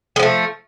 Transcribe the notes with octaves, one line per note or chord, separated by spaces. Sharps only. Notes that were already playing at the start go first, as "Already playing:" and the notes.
F3 G#3 A3